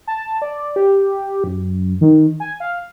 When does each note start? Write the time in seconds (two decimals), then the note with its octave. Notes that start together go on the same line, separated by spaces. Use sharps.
0.07 A5
0.42 D5
0.76 G4
1.44 F#2
2.01 D#3
2.40 G#5
2.60 F5